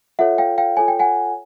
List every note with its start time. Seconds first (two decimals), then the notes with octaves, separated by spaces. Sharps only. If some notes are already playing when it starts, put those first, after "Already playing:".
0.19 F4 A4 C#5 E5 F#5
0.38 F5 G5
0.58 F5 G5
0.77 F4 A4 C#5 G#5
0.88 G5
0.99 F#5 G#5